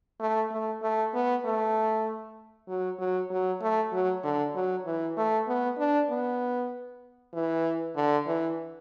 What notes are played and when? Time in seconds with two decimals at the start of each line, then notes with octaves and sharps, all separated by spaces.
0.20 A3
0.51 A3
0.82 A3
1.14 B3
1.45 A3
2.68 F#3
2.99 F#3
3.30 F#3
3.61 A3
3.92 F#3
4.23 D3
4.55 F#3
4.86 E3
5.17 A3
5.48 B3
5.78 D4
6.09 B3
7.34 E3
7.96 D3
8.27 E3